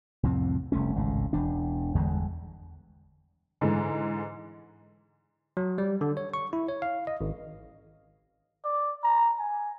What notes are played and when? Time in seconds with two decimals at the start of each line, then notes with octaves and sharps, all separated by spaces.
0.23 C2 F2 A2 C4
0.72 F1 C2 A3 C#4
0.96 G#1 C#2 A2
1.33 E1 E2 D4
1.95 G1 E2 D3 G#3
3.61 G#2 D3 E3 G#3
5.57 F#3
5.78 G3
6.01 D3
6.17 C#5
6.34 C#6
6.53 E4
6.69 C#5
6.82 F5
7.07 D#5
7.21 G#1
8.65 D5
9.04 A#5
9.39 G#5